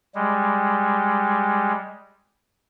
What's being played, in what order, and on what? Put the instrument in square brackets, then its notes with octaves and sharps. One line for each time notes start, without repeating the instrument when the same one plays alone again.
[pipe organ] G3 G#3